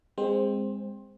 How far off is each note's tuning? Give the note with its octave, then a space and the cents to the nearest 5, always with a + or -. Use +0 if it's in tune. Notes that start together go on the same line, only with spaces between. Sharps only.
G#3 -25 C4 +0 C5 +15